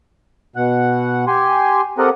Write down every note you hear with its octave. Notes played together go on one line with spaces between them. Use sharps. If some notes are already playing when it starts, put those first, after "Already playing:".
B2 F#5
G4 G#5 C6
C4 G4 A4 A#4 D#5 F#5